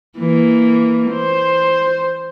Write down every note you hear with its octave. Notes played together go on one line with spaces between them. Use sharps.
E3 A#3
C5